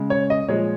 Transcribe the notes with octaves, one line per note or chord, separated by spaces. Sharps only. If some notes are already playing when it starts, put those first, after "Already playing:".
Already playing: C#3 G#3
C#5
D#5
A#2 F3 G#3 C#5